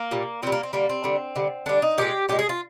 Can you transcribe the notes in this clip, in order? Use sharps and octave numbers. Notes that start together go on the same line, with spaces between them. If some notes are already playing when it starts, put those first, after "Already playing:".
Already playing: A#3
A#2 G3
A#2 G3 C4
A#3
C4
D3 G3 A#3
C4
D3 G3
D3 G3
D3 G3 D4
D#4
A#2 F3 G#3 G4
A#2 F3 G#3 G4
G#4
F4